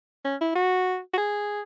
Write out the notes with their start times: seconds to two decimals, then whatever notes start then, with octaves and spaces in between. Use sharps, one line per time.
0.24 C#4
0.41 E4
0.55 F#4
1.13 F#4
1.17 G#4